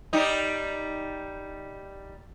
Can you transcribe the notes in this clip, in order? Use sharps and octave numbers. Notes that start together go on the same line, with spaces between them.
G3 D#4